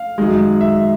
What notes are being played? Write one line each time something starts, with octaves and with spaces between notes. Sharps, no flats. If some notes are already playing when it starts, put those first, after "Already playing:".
Already playing: F5
F#2 D#3 G#3
E5